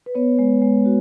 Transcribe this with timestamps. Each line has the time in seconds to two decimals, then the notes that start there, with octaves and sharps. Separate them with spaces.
0.06 B4
0.15 B3 C#5
0.39 G#3
0.62 G#3
0.85 F#4